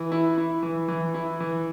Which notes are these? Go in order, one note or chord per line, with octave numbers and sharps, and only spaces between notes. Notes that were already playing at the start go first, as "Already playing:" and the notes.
Already playing: E3
E4
E4
E3
E3
E4
E3